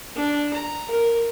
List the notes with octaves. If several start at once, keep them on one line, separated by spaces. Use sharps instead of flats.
D4
A#5
A#4